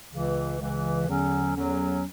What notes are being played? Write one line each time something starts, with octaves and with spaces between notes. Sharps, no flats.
C#2 C#3 E3
C#2 C#3 E3
E2 D3 F#3 C#4
E2 D3 F#3 C#4